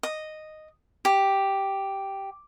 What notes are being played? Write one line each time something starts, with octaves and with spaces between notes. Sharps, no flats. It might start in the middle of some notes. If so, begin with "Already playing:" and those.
D#5
G4